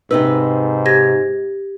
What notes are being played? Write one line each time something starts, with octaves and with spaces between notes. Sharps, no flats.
G#2 C3 D#4 B4 E6
G4 G#6 A#6